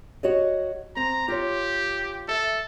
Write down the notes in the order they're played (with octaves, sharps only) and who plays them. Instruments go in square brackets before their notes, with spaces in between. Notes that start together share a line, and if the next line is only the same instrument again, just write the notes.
[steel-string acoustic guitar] F#4 C#5 D#5
[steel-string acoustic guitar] C4 [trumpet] A#5
[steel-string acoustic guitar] F4 C#5 [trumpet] G4
[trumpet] A4 [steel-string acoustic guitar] E5